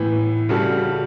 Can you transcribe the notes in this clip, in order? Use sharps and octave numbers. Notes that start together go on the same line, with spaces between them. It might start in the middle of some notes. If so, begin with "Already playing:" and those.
Already playing: A2 E3 B3
C#3 G3 C#4 F#4 A4